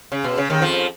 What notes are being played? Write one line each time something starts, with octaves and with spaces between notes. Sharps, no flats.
C#3
B2
C#3
D#2 D#3
F2 F3